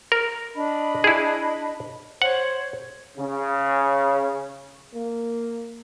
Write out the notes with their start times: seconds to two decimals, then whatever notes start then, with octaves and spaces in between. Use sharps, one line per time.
0.12 A#4
0.55 D4 D#5 B5
1.04 E4 G#4
2.22 C5 C#5 F#5
3.17 C#3
4.94 A#3